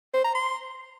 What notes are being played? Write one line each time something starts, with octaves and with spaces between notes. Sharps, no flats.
C5
A#5
C6